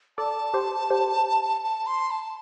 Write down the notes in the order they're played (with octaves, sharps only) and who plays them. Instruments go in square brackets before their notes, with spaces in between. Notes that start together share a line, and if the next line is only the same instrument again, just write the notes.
[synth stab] A4 D5 [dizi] A5
[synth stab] G4 C5
G4 C5
[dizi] A5
C6
A5